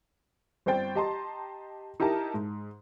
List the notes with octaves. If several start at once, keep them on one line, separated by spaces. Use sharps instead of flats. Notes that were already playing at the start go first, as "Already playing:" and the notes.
G1 C4 C5 G5 A6
G4 D#5 A5 A#5 C6
D#4 E4 G4 A#4 A5 A#5
G#2